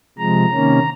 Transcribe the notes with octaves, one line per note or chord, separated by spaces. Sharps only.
C3 F3 G#3 A#5
C3 D#3 A#3 C#4